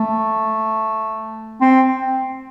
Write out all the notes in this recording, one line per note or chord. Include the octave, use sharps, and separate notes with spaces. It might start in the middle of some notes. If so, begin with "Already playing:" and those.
Already playing: A3
C4